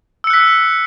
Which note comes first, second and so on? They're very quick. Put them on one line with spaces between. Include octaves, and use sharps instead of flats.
E6 C#7 F#6 B6